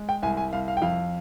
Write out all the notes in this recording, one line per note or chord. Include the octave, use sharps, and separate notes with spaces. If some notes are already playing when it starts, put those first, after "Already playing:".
Already playing: G#3
G5
C2 G#5
G#5
C2 F5
F5
G5
F2 F5